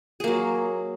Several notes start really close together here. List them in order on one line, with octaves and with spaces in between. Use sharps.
G#4 A#3 F#3